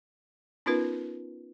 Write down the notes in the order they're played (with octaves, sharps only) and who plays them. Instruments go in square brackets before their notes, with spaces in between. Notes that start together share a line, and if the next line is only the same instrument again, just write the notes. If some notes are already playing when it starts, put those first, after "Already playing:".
[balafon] B3 C#4 D#4 F4 A#4 B4